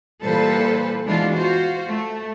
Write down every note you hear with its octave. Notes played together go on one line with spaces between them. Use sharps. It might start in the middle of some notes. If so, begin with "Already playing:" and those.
A#2 E3 G3 A4 B4 C5
B2 E3 G#3 B3 D4 F4
F4 F#4 C5
A3